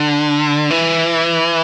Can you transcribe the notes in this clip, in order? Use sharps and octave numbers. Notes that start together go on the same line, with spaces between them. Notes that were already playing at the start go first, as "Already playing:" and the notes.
Already playing: D3
E3